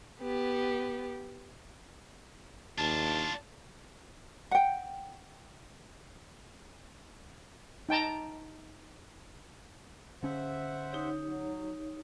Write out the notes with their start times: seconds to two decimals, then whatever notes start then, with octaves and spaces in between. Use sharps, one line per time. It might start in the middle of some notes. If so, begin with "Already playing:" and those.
0.21 B3 G4
2.78 D#2 D4 F4 A5
4.51 F#5 G5
7.89 D#4 G5 A5 A#5
10.23 D3 C#4 C5 E5 F#5
10.92 D#4 G4 C#5
11.25 F#3